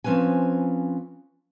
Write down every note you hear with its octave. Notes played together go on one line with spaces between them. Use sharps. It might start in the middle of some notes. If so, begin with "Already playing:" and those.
F3 C4 C#4 B4 G#5